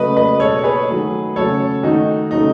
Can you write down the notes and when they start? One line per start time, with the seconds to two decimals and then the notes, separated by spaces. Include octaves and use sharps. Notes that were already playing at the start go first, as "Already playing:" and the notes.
Already playing: C#3 F#3 A3 B4 D#5
0.16 B4 D#5
0.40 B2 G#3 A4 C#5
0.59 C#5
0.63 G#4 B4
0.88 D#3 F#3 A3
1.36 C#3 F#3 A3 A4 C#5
1.83 D#3 A3 D#4 F#4
2.31 C#3 F#3 A3 D#4